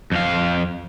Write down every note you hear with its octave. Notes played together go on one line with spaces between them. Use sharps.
F2 F5